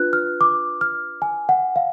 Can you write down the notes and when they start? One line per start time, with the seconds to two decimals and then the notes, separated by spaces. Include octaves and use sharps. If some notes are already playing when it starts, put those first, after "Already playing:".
Already playing: D4 F4 B4 F#6
0.13 F6
0.41 D6
0.81 F6
1.22 G#5
1.49 F#5
1.76 F5